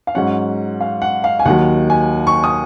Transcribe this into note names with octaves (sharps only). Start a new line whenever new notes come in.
F5
G#2 F#3 C#4 F#5
F5
F#5
F5
G#5
D#2 D#3 F#3 F#5
G#5
C#6
D#6